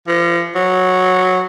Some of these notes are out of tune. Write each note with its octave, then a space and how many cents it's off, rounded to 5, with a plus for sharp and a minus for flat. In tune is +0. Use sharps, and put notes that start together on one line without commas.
F3 -35
F#3 -5